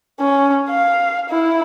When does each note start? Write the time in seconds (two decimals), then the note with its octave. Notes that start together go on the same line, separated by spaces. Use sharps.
0.21 C#4
0.70 F5
1.29 E4